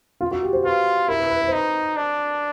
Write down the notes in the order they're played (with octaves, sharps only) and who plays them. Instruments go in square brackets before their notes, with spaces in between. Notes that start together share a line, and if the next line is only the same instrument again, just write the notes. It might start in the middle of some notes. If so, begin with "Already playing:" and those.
[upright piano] F4
F#4
G4
C5
[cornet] F4 [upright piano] B4
[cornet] E4 [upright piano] A#4
[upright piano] B4
B4
B4
C5
[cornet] D#4 [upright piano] B4
[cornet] D4